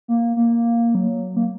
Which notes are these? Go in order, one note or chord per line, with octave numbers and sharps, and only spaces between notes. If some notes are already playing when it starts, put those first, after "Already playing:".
A#3
A#3
F#3
A#3